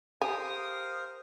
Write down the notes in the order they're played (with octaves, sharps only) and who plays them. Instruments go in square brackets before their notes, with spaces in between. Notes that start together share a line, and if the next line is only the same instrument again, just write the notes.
[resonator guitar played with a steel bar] G4 [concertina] A#4 C5 F5 [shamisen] G#5 [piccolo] D#6